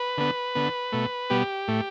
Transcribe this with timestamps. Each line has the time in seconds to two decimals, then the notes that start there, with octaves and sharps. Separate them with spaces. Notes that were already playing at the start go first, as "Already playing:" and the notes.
Already playing: B4
0.18 D3 B3
0.55 D3 B3
0.92 B2 A3
1.30 B2 G3 B3 G4
1.68 A2 A3